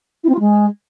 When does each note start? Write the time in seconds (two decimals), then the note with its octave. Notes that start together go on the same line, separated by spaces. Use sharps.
0.23 E4
0.29 C4
0.34 F4
0.39 G#3